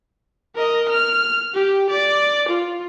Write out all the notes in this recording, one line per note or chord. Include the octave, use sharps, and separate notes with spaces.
A#4 D#5
F6
G4
D5
F4